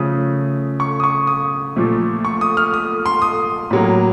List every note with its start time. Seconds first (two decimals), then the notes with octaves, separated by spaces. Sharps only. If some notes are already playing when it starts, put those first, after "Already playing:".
Already playing: C#3 F3 A3 D#6
0.80 C#6
1.00 D#6
1.04 C#6
1.27 D#6
1.76 A#2 F3 A3
2.25 C#6
2.41 D#6
2.57 F6
2.74 D#6
3.06 C6
3.22 D#6
3.71 A2 F#3 A#3